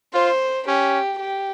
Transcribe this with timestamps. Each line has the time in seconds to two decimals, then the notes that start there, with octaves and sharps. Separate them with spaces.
0.13 F4 C5
0.67 C#4 G4
1.20 G4